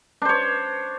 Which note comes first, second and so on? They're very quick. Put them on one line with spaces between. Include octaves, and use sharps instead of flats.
D4 C5 C#5